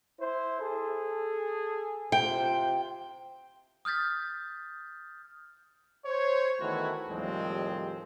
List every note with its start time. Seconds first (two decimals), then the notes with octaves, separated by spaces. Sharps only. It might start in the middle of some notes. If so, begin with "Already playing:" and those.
0.20 E4 C5
0.60 G#4 A4
2.12 C3 F4 C5 G5
3.85 D#6 F6 G6 A6 B6
6.06 C5 C#5
6.60 D#3 E3 A3 B3 E4 F#4
7.09 D#2 A2 F3 G3 G#3 C4